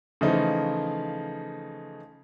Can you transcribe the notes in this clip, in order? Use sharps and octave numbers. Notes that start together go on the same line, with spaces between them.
C#3 E3 F3 A3 D#4